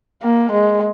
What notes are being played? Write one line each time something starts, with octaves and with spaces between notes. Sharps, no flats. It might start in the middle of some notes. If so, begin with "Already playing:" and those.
A#3
G#3